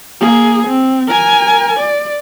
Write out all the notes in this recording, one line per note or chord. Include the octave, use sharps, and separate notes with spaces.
A#3 G#4
C4
A#4 G#5
D5